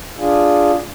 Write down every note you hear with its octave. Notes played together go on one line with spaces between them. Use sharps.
D4 F4 G#4